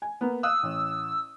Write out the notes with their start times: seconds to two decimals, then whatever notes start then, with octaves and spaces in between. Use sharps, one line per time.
0.02 G#5
0.21 A#3 B3
0.43 F5 D#6 E6 F#6
0.63 A1